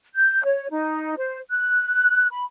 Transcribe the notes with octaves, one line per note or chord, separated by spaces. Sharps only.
G6
C#5
D#4
C5
F#6
B5